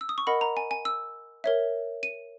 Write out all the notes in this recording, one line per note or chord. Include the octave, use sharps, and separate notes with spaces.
E6
D#6
C#6
A#4 D#5 F#5 B5
A#5
G#5
G#5
E6
A#4 C#5 E5
D#7